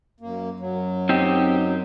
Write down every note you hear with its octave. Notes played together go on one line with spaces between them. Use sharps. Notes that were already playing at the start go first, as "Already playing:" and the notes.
F#2 A#3
F#2 F#3
C4 D#4 G4